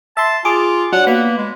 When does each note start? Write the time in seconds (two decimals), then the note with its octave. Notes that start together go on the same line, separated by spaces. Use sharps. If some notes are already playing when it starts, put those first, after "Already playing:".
0.17 E5 A5 C6
0.45 F4 G#4 D6
0.93 F#3 D4 F#5
1.07 A#3 B3 B5
1.38 G#3